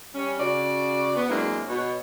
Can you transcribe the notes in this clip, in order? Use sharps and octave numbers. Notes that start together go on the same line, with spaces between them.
G3 C#4
C#3 F#4 D5
B3
F#3 G#3 A#3 C4 D4 E4
B2 C#5